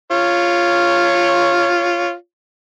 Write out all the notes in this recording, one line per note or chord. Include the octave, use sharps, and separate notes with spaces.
F4 C#5